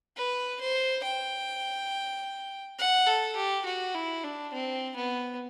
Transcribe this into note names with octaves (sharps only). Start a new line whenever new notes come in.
B4
C5
G5
F#5
A4
G4
F#4
E4
D4
C4
B3